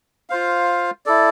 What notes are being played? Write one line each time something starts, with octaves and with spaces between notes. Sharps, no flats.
F4 C5 F5
E4 A4 D5